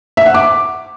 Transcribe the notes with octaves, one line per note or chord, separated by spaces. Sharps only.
E5
F#5
D6